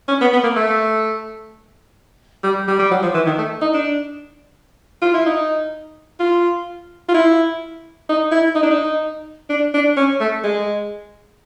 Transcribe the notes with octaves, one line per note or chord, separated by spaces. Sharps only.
C#4
B3
B3
A#3
A3
G3
G3
G3
F#3
F3
E3
D#3
A3
D#4
D4
F4
E4
D#4
F4
F4
E4
D#4
E4
D#4
D4
D#4
D4
D4
C#4
A3
G#3